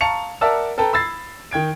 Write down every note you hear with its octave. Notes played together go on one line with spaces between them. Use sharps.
F5 A5 A#5 C#6 C#7 F7
A#4 D5 E5 F#5 A5 E6
A4 B4 G5 A5 A#5
B5 E6 G#6 A6 C7
D#3 G5 G#6 D7